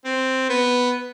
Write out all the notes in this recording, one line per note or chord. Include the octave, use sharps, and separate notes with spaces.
C4
B3